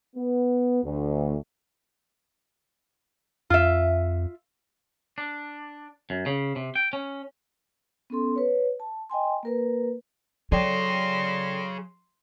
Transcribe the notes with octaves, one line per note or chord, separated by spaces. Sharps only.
B3
D2
F2 F4 E5
D4
F#2
C#3
C3
G5
C#4
B3 C#4 A4 C6
B4 C#5
A5
D#5 G5 G#5 C6
A#3 A#4 B4
F#3 G#4 A4 C#5 D5 G5 C6 A#6